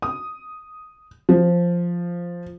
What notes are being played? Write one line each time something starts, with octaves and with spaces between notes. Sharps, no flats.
D#6
F3